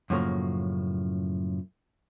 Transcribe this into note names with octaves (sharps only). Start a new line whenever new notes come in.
F#2 A2 C#3 F3 A#3